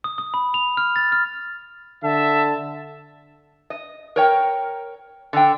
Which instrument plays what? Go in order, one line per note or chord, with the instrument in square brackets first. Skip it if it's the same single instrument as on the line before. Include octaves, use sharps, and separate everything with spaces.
[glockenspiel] D#6
D#6
B5
F7
F6
A6
F6
[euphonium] D3 [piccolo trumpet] E5 [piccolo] A5
[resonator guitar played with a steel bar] D#5
A#4 C#5 G5
D3 G5